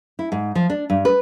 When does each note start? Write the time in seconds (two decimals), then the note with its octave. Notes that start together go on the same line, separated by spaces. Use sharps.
0.19 E4
0.32 G#2
0.55 F3
0.70 D4
0.90 G2
1.05 B4